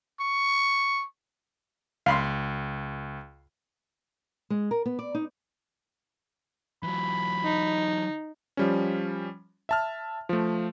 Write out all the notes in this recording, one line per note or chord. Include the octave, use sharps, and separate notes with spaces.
C#6
C#2 F5 B5 C6
G#3
A#4
B3
D5
D#4
E3 F#3 B5
D#4
F3 G3 C#4
E5 A5 F6
F3 A3